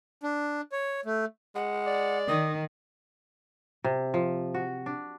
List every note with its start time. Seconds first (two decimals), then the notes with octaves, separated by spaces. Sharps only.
0.23 D4
0.72 C#5
1.05 A3
1.55 G#3 F#5
1.86 D5
2.28 D#3 D#6
3.84 C3
4.14 F3
4.54 F#4
4.86 D4